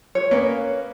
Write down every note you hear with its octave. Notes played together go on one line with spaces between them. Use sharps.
C#5
A#3 B3 C#4